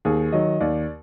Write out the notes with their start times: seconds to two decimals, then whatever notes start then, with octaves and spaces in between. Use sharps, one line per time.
0.05 D#2 G#4
0.32 D#3 F#3 D#5
0.61 D#2 D5